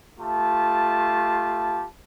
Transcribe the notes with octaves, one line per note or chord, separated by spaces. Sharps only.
A3 F4 G4 A5